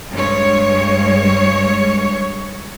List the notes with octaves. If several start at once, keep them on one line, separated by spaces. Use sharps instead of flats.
G2 G#3 C#5